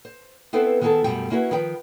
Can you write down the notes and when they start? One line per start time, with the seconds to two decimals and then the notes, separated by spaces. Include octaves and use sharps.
0.05 C5
0.53 B3 C4 E4 A4 B4 C5
0.81 D#3 B3 E4 G#4 A4 A5
1.04 F#2 B2 G3 A3 G5
1.30 A#3 C#4 E4 F#4 A#4 B4
1.51 D#3 F3 B4 G5